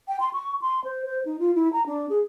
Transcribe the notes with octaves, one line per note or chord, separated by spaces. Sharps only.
G5
C6
C#6
C6
C5
C5
D#4
F4
E4
A#5
D4
G#4